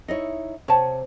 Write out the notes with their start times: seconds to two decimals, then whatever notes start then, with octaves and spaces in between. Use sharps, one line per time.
0.08 D#4 E4 C#5 D#5
0.68 C3 C#5 A5